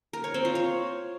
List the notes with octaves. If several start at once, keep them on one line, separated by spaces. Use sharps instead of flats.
A#4
C#5
C4
F4
C#5